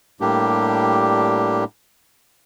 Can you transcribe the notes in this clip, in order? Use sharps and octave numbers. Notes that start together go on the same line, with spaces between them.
A2 G3 A#3 D4 G4